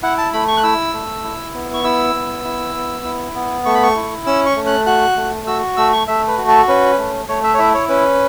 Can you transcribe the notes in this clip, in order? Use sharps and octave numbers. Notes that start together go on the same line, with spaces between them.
E4 F#5
A5
A3 B5
C#6
F#6
E4 E6
A3
E4
B3
C#6
E4 E6
B3
E4
B3
E4
B3
A3 C#6
B5
C#6
E4
C#4 E6
C#6
A3
F#6
F#4 F#6
A3
F#4 E6
A3 E6
C#6
A3 E5
B4
F#4
A4
C#4 B4
A3
A3 C#5
E5
C#5
E4 E5
C#5
C#4 B4